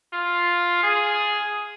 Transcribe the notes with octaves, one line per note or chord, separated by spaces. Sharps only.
F4
G#4